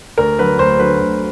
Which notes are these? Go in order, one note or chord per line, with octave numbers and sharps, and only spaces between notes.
D2 A#4
D3 F#3 B4
D2 C5
D3 F#3 B4
D2